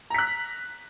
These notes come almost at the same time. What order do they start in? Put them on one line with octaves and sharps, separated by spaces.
A#5 B6 F#6